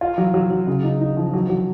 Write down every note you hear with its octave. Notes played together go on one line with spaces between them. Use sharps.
F4
F#3
F#3
F#3
C#3
D#4
D#4
F3
F#3
F#3